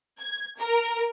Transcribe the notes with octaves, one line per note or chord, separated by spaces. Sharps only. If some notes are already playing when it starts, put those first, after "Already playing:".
G#6
A#4